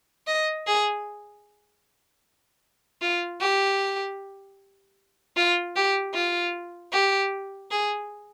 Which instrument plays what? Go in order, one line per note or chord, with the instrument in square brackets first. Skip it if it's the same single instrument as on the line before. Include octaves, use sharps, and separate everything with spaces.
[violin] D#5
G#4
F4
G4
F4
G4
F4
G4
G#4